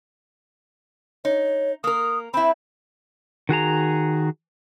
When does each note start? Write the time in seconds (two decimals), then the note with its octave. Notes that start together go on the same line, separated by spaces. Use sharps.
1.25 D#4 C#5
1.84 A#3 A#4 D#6
2.34 C4 E4 B5
3.49 D#3 F#4 G#4 A#5